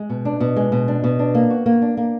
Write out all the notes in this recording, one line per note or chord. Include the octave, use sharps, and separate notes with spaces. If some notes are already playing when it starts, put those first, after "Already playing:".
Already playing: G#3
B2
D4
B2
G#3
B2
D4
B2
D4
A#3
F#4
A#3
D4
A#3